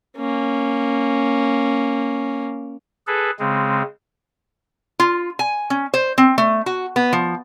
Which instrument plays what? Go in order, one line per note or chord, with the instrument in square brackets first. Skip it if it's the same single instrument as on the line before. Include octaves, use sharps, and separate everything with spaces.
[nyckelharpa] A#3 C#4
[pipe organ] G#4 A4 B4
C#3 G#3 C4
[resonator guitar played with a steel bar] F4
G#5
C#4
C5
C4
A3
F#4
B3
F3